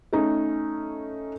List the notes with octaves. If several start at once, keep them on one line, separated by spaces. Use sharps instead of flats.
A3 C#4 D#4